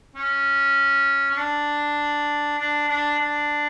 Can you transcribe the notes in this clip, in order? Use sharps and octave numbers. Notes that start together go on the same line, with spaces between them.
C#4
C#4
D4
D4
D4
D4